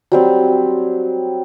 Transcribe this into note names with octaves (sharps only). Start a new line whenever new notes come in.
F#3 G3 C4